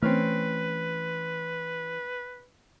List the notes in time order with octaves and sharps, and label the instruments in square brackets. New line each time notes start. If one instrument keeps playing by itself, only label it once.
[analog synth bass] E3 [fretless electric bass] A3 [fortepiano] C4 C#4 F6 [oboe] B4